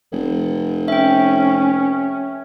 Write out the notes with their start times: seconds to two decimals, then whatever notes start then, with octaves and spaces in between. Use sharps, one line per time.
0.12 F1
0.88 C#4 E5 G5